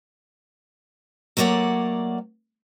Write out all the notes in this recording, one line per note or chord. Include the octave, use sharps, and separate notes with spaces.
F#3 A3 A#3 C#5 D5 F#5